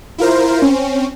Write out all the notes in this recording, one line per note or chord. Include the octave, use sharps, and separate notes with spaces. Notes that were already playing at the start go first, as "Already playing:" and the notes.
E4 F4 A#4 C5
C4 C#4